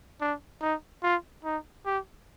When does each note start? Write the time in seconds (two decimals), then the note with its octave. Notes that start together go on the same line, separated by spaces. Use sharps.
0.21 D4
0.62 D#4
1.03 F4
1.45 D#4
1.86 G4